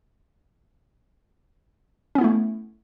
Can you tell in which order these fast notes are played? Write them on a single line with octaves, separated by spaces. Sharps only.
C#4 B3 E4 A3